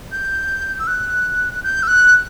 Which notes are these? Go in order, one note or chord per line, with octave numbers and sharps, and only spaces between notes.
G6
E6
F#6
G6
E6
F#6